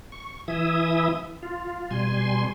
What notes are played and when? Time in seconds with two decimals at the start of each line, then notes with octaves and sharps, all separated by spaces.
0.12 C#6
0.48 E3 E4 E5 D#6
1.43 F4
1.91 B2 G3 G#5 C6